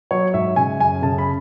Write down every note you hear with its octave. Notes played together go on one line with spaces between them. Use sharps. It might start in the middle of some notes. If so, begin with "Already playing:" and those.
F#3 C#5
G#2 E5
C#3 G#5
F#2 G#5
C#3 A5
B5